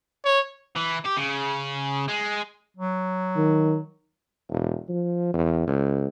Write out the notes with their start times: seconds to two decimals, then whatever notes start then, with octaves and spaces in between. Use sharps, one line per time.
0.25 C#5
0.76 E3
1.05 G4
1.17 C#3
2.08 G#3
2.77 F#3
3.37 D#3
4.50 E1
4.89 F3
5.34 E2
5.67 C#2